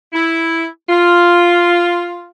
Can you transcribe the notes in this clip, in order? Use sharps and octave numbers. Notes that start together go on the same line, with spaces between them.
E4
F4